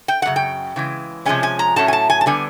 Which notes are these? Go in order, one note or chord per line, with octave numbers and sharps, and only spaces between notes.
G5
F#2 C#3 F#5
G5
C#3 E3 G#3
C3 F3 G#3 C#4 G#5
G#5
A#5
A2 F#3 A3 C#4 A5
G#5
A5
G#5
A5
D3 G3 B3 G#5